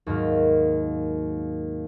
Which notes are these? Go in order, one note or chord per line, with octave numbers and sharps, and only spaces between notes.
D#2 G#2 F#3 A#4 F5